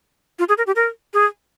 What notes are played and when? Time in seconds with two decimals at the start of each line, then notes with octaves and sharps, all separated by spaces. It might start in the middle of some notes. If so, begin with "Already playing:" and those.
0.39 F4
0.49 G#4
0.58 A#4
0.67 G4
0.76 A#4
1.14 G#4